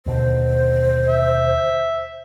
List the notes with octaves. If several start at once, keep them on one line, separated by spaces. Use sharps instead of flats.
D#2 B2 D3 C5
E5